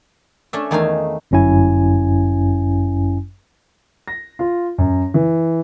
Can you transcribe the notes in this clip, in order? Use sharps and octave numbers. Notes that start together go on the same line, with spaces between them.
A3 C#4 D4 A4 D5 E5
E2 D#3 A3 D#4 F5 G#5
G1 F#2 C#4 E4 G#5
A#6
F4
F#2
E3